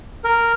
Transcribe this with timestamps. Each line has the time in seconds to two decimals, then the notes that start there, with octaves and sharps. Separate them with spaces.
0.24 A#4